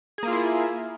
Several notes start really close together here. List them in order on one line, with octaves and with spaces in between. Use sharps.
G#4 A#3 F4 E4